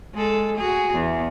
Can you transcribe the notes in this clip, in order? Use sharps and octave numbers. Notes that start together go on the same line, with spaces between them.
G#3 A4
F#4 G#4
E2